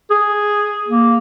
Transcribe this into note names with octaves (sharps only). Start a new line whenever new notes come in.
G#4
A#3